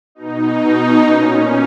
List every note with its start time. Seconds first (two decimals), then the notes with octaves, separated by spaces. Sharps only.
0.15 B2 D#4
1.02 A#2 C#4